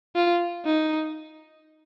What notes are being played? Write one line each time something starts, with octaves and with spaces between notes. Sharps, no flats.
F4
D#4